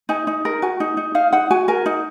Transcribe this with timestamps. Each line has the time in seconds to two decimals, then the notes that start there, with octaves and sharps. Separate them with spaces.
0.09 D#4 G#5
0.27 D#4
0.45 A#4
0.62 F#4 G#5
0.80 D#4
0.97 D#4
1.15 D#4 F5
1.33 D#4 F#5
1.51 F#4 G#5
1.68 A#4 G#5
1.86 D#4